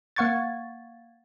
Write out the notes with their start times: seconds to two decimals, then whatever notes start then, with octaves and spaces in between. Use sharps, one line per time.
0.16 A#3 F5 F#5 C#6 G#6 A6